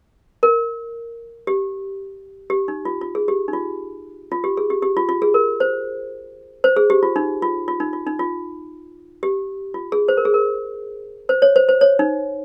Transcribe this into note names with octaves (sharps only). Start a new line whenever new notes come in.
A#4
G4
G4
D#4
F4
F4
G#4
G4
D#4
F4
F4
G4
G#4
G4
G4
F4
F4
G#4
A#4
C5
C5
G#4
G4
F4
D#4
F4
F4
D#4
F4
D#4
F4
G4
F4
G#4
C5
A#4
G#4
A#4
C5
C#5
C5
C5
C#5
D#4